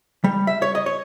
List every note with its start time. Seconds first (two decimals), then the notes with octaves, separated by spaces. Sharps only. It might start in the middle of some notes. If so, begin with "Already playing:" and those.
0.24 G3
0.47 E5
0.62 C#5
0.75 D#5
0.86 C#5